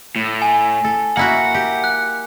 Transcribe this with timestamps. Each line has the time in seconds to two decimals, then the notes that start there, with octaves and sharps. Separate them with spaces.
0.16 A2
0.42 G#5
0.84 A4
1.17 A#3 E4 F#4 F#5
1.54 G4
1.84 F#6